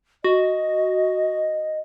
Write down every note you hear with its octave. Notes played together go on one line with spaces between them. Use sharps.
F#4 D#5